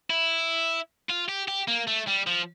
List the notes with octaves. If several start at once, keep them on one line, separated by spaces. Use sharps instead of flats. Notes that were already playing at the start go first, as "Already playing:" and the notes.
E4
F4
G4
G4
A#3
A3
G3
F3